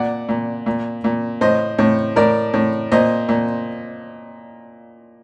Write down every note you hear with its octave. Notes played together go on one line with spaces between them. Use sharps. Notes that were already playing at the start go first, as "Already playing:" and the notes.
Already playing: A#2 D5 F#5
A#2
A#2
A#2
A2 C5 D#5
A2
A2 A#4 D5
A2
A#2 C5 D#5
A#2